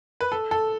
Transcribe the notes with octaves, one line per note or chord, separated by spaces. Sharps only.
B4
A4
A4